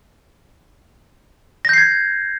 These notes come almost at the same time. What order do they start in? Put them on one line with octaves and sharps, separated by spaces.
A#6 G6 C7 G#6